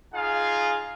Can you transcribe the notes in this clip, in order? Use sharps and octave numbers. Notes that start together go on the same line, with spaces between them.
D#4 F4 G#4 F5